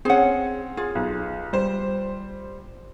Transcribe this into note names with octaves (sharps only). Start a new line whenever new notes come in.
C4 C#4 G#4 F#5
F4 G#4
B1
G3 C5